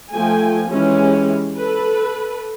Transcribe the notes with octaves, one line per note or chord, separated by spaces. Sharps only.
F3 A3 G5 G#5
E3 G#3 C#4 G4
A4 B4